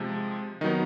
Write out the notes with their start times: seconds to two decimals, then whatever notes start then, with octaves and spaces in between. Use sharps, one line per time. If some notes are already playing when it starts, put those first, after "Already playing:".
Already playing: C3 F3 G#3
0.61 D#3 D#4
0.64 F#3 B3